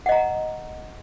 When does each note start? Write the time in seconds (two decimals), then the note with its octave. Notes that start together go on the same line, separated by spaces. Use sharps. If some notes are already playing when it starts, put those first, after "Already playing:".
0.06 F#5
0.09 D#5
0.12 A#5